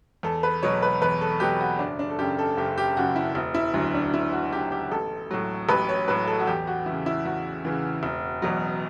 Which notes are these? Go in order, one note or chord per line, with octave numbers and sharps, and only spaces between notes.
E2 A4
B4
B2 F#3 C#5
B4
E2 B4
A4
B2 F#3 G4
F#4
F#1 D4
D4
A4
F#2 C#3 G4
A4
F#1 G4
G4
F#2 C#3 F#4
E4
E1
E4
D2 D3 F#3
D4
E1 E4
F#4
D2 D3 F#3 G4
G4
A1 A4
A2 F#3
A1 B4
C#5
A2 F#3 B4
A4
F#4
E2 G4
F#4
C#3 E3 E4
E4
E2 F#4
C#3 E3
E1
E2 B2 F#3